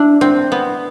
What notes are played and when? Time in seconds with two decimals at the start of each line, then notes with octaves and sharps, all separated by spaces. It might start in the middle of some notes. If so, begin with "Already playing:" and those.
Already playing: D4 E4
0.21 C4
0.52 B3